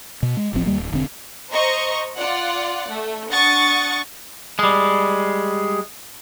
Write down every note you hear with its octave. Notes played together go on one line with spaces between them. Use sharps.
B2
G#3
E1 A1 F3 C4
D#2 C#3 G3 A#3
D1
E1 D3 C4
C5 D#5 A#5 C#6
F4 D5 F#5
A3
D4 F#5 C#6 D#6 A6
G3 G#3